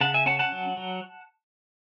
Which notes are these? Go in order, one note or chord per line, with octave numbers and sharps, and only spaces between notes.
C#3 F#5 A5
E5 G#5
C#4 F#5 A5
F#5 A5
F#3
F#3